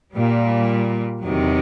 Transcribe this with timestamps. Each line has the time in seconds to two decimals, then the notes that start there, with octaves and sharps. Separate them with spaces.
0.13 A#2 G3
1.23 E2 C3 D#3 F#3